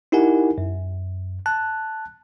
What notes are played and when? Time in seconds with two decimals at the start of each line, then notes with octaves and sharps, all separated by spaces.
0.12 D#4 E4 G4 A#4 F#5 G#5
0.58 F#2
1.46 A5 F#6